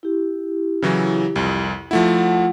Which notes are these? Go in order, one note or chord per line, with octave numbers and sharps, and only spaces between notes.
E4 G4
C#3 E3 F#3
C2 F2
F3 A3 E4 F4 F#5